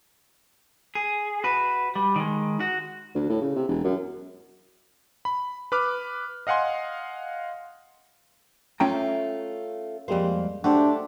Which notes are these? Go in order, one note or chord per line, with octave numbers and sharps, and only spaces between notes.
G#4
F#4 B4
G3
D#3 G#3
F#4
D2
A2
C#3
C3
E1
F#2
B5
B4 B5 D6 F6
D#5 F5 F#5 G#5 C6
A3 C#4 F4 G5 A#5
F2 G3 G#3 A#3 C5
A3 D4 F#4 G4 C5